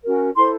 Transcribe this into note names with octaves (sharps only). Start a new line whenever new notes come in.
C#4 F#4 A#4
E4 A4 C5 C6